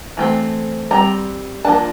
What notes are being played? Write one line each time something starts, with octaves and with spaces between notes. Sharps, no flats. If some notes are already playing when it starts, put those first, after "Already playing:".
E3 A3 C4
G3 C4 A#5
F3 A#3 D4 A5